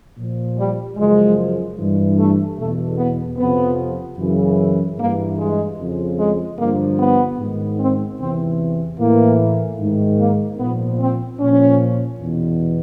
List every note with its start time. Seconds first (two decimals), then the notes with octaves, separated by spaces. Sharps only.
0.17 A#2 F3
0.56 G3
0.96 F#2 C#3 F3 G#3
1.77 G2 E3
2.17 A3
2.57 E2 B2 A3
2.97 B3
3.37 F2 C3 F3 B3
4.17 F#2 C#3 E3
4.98 G2 E3 A#3
5.38 G#3
5.77 F2 C#3 F3
6.18 G#3
6.58 G2 D3 F3 A#3
6.98 B3
7.39 G#2 D#3
7.78 C4
8.18 E2 C3 E3 C4
8.99 A2 E3 A#3
9.78 G#2 D#3
10.19 A#3
10.58 A#2 F3 B3
10.99 C4
11.39 A#2 F3 C#4
12.19 E2 B2